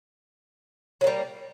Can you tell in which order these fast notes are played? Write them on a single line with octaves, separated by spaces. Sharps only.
F#3 A#3 G3